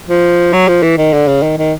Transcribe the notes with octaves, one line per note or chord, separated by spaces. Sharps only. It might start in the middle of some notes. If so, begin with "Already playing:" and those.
F3
F#3
F3
E3
D#3
D3
C#3
D#3
D#3